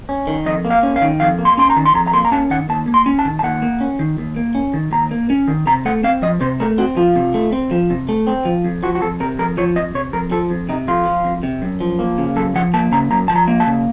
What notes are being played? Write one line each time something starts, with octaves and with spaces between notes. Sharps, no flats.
C#4
D#3
F2 D#5
A#3
F5
C#4
F5
D#3
F2 F5
A#3
C6
C#4 C6
A#5
D#3
C6
F2 A#5
A#5
A#3 C6
A#5
C#4 A5
D#3 F#5
D#2 A5
A#3
C6
C#4
A5
D#3
A5
D#2 F#5
A#3
C#4
D#3
D#2
A#3
C#4
D#3
D#2 A#5
A#3
C#4
D#3
C3 A#5
A3 F#5
C4 F5
F3 D#5
C3 C5
A3 A#4
C4 F#4
F3 F4
C3
A3
C4
F3
C3
A3
C4
F3
F2
F3 F#4
F#4
F2 A4
C3 A#4
F2 A#4
F3 C#5
F2 D#5
C3 C#5
F2 A#4
F3 A4
F2
C3 D#4
F2 F4
F3
F2
C3
F#2
F3
A#3
C#3
F#2 A4
F3 F#5
A#3 A5
C#3 A#5
F#2 A#5
F3 A5
A#5
A#3
A5
C#3